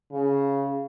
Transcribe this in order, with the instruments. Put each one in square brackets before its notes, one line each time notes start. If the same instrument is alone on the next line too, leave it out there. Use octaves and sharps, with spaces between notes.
[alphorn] C#3